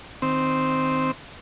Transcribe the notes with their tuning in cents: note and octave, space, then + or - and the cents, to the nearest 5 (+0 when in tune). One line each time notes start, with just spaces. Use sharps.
D#3 +0 C4 +0